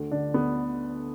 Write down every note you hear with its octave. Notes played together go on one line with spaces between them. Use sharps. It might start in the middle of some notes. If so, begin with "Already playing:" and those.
Already playing: D2
D3 D4
D2 B3